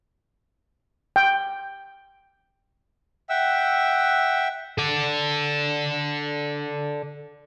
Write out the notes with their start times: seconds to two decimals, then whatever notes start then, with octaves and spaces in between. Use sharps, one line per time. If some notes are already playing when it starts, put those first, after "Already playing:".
1.16 G5
3.29 E5 F#5 G5 E6
4.78 A4 D5